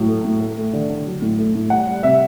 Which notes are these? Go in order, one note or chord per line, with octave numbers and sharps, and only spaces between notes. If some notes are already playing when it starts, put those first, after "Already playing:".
Already playing: A2 F#3
A3
A2
A3
A3
D3
D3
F#3
A2
A3
A2
G3 F#5
G3
C3 E5